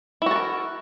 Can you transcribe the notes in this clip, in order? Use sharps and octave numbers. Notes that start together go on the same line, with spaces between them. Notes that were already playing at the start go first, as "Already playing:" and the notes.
E4 F#4 A4 A#4